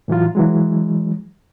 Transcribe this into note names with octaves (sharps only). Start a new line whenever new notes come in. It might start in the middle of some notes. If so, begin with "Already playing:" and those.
A2 E3 F#3 F4
E3 F#3 G#3